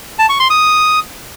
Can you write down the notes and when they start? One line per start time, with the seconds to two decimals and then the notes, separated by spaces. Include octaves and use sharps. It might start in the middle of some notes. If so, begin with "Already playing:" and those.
0.19 A5
0.29 C#6
0.40 C6
0.50 D#6